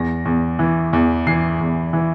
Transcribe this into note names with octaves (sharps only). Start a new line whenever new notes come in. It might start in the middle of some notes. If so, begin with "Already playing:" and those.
Already playing: E2 A#6
E2
E3
E2
E3 C7
E2
E3